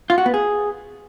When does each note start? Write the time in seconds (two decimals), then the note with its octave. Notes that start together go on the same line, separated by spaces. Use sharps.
0.10 F4
0.18 F#4
0.26 B3
0.34 G#4